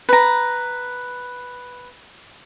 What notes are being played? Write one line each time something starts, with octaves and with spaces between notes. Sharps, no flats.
B4 A#5